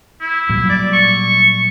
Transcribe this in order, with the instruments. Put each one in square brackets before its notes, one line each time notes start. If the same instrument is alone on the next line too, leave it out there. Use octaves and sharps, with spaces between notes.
[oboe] E4
[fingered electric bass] A#2 F#3 G3
[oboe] D5
C#6